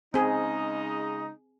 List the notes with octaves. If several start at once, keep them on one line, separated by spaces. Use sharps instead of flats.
C#3 G#3 C4 D#4 G#4